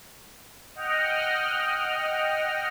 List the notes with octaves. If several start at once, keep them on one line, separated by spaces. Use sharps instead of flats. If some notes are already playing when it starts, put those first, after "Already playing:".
D#5 F#5 G5 F6